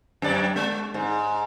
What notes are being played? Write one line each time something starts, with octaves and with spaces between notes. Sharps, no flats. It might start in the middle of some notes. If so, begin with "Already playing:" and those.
F#2 D5
G#3
G#2